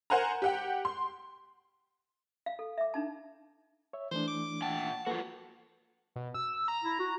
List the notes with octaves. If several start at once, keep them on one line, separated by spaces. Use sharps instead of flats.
A#4 C5 F#5 G#5 A#5
G4 F#5 G5
C6
F5
A4
E5 D6
D4 D#4 A5
C#5 E5
E3 A3 D4 C5
D6
A#2 F#5 G5 A5
F3 A#3 F#4 A4 B4
B2
E6
A#5
E4
F#4